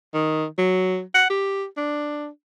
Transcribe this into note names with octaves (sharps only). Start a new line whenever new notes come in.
D#3
F#3
F#5
G4
D4